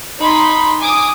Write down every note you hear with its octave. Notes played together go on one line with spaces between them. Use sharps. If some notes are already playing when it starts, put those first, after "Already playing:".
D#4 B5 C6
G#5 D6 D#6